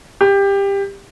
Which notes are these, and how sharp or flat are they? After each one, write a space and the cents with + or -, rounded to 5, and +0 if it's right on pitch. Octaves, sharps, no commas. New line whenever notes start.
G4 +20